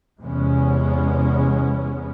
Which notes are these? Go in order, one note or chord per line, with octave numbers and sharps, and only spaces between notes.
E2 C3 G#3 B3 C#4